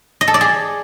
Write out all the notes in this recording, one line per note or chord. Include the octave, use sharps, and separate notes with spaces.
D#5
A4
D5
G#4